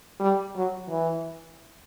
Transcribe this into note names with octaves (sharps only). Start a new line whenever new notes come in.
G3
F#3
E3